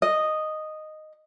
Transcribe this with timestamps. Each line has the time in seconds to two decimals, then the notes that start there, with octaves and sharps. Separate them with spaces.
0.02 D#5